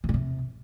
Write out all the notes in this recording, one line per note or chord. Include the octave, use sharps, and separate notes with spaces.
C3
A#2
C3